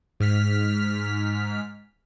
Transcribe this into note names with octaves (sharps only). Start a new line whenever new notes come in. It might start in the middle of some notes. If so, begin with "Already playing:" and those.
G#2 F6 B6